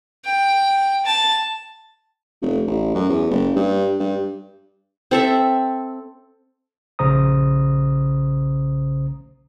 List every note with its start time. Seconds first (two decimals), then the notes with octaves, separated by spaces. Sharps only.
0.25 G5
1.05 A5
2.41 F1
2.67 A1
2.94 F#2
3.09 E2
3.31 F#1
3.55 G2
4.00 G2
5.11 C4 A4 E5
6.99 A#1 C#3 C5 A#5 D#6